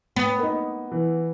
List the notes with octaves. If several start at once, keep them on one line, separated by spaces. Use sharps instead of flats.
B3
A#3 D#4
E3